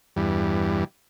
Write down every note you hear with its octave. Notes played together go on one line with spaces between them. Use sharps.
E2 G2